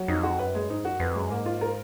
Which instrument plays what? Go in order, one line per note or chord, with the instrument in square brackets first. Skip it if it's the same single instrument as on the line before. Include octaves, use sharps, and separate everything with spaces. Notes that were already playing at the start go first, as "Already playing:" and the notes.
Already playing: [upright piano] F#3
[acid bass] F2 [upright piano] D#4
[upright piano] F#4
[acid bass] F#2 [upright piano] B4
[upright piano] G#3
[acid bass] G#2 [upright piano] D#4
[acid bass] F#2 [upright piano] F#4
[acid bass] F2 [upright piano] B4
[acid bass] F#2 [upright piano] G#3
[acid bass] G#2 [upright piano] A#3
[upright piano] F4
A#4